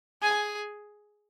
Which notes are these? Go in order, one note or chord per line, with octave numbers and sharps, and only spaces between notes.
G#4 G#5